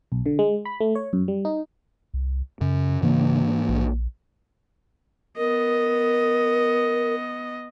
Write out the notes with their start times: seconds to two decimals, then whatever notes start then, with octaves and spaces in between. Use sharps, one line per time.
0.12 B1
0.26 D3
0.39 G#3
0.65 B5
0.80 A3
0.95 C#5
1.13 F#2
1.28 G3
1.45 D#4
2.14 C2
2.61 F#2 C#3
3.02 G#2 C#3 E3 A#3
3.69 A#1
5.37 B3 A#4 D#5